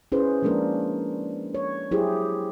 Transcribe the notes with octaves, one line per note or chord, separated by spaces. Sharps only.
C#4 E4 G#4 B4 C5
F3 G#3 A#3 D4 A#4
C#5
F#3 E4 G4 G#4 C5